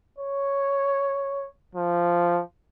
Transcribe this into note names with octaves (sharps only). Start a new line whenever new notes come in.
C#5
F3